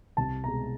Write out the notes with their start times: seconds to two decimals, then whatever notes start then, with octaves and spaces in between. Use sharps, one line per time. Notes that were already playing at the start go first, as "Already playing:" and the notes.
0.17 C2 A5
0.44 B2 G#3 A#5